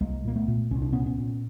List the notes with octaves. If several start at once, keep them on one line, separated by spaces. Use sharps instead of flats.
C2 G#3 A#3
A#2 A#3
A3 B3
A#2
C2 C#4
D4
A#2 B3 C#4
B3 C#4
A#2